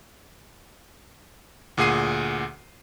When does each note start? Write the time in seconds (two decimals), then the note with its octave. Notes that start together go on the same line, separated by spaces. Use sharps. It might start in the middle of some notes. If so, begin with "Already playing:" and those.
1.77 D2 A#2 G#4 F#5 C7 D#7